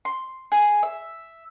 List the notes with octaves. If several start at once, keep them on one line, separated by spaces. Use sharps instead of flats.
C6
G#4
E5